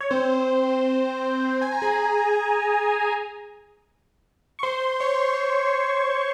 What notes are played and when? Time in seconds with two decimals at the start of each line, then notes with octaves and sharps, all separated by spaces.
0.01 C#5
0.11 C4 C5
1.61 G#5
1.72 A#5
1.82 G#4 G#5
4.59 C#6
4.63 C5 C6
5.00 C#5 C#6
5.38 C5 C6